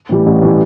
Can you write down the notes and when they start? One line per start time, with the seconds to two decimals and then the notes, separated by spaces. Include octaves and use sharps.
0.09 A2 E3 G3
0.26 A1
0.42 A2 E3 G3